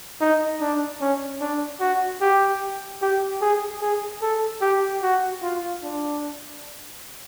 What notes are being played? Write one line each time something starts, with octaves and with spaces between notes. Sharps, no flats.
D#4
D4
C#4
D4
F#4
G4
G4
G#4
G#4
A4
G4
F#4
F4
D4